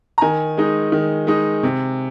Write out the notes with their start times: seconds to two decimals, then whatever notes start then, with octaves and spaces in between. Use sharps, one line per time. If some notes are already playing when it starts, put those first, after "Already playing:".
0.18 A#5
0.21 D#3 G#5
0.57 G#3 D#4
0.92 D#3
1.27 G#3 D#4
1.63 C3